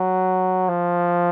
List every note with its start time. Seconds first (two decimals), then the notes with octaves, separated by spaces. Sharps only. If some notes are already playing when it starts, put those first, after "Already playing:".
Already playing: F#3
0.69 F3